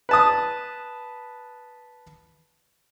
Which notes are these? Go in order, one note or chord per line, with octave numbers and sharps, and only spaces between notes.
B4 A5 D#6